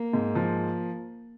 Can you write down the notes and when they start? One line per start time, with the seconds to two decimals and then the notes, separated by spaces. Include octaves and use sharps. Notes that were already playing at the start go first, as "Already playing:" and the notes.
Already playing: A#3
0.13 G#2
0.35 F3